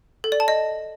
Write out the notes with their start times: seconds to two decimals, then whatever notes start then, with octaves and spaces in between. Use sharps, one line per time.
0.24 A4
0.32 D5
0.40 A5
0.48 D#5